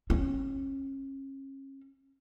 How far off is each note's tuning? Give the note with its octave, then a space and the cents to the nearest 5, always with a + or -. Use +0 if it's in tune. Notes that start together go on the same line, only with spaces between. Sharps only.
C#4 -35